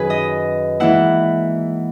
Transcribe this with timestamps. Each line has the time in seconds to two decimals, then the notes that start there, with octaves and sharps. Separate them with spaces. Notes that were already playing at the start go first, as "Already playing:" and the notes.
Already playing: F#2 D#3 G#4 B4
0.10 D#5
0.80 G#2 E3 A#3 E4 F#5